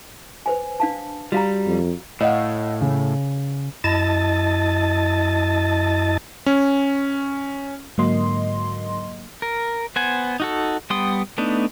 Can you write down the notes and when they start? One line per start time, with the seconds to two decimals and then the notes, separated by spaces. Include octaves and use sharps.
0.46 B4 C5 G#5
0.80 D4 F5 A5
1.32 G3 F#4 F5 A#5
1.67 F2
2.21 A2 D#5 F5 F#5
2.81 C#3
3.84 F#2 E4 D#5 A5 A6
6.46 C#4
7.98 G#2 D3 F#3 A#3 D#5 C6
9.42 A#4
9.96 B3 C5 F#5 G#5
10.40 D#4 F#4 A4
10.90 G3 B3 G5 C6 D#6
11.38 A3 B3 D4 D#4